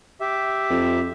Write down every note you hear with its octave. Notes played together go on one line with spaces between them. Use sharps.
G4 E5
F2